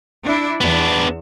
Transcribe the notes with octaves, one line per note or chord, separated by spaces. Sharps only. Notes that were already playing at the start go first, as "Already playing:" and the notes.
D4 E4
E2 B3 D4